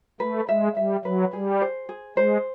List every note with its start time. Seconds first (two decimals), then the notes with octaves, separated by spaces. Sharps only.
0.20 A3 B4
0.49 G#3 E5
0.77 G3 E5
1.05 F#3 B4
1.33 G3 G#4
1.62 C5
1.89 G#4
2.17 G#3 C5